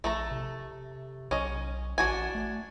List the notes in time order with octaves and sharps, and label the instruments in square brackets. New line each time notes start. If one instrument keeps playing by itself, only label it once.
[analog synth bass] A#1 [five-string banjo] A3 A4 A#5
[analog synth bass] C3
[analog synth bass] B1 [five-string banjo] C#4 D#5
[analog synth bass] A1 [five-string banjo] D4 F#4 G#5
[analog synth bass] A3